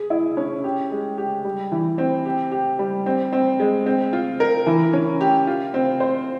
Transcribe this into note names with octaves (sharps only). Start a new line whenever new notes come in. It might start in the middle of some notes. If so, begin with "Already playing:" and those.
Already playing: G#4
E4
C#4
G4
G#3
G4
G3
E3
C4
G4
G4
G3
C4
C4
G#3
C4
F4
A#4
E3
C#4
G4
F4
C4
C5